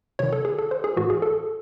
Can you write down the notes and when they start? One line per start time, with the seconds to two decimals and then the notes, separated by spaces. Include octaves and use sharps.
0.19 C3 D#3 C#5
0.33 A4
0.45 G#4
0.59 A4
0.71 C5
0.84 G#4
0.97 A2 E3 F#4
1.10 G#4
1.22 A4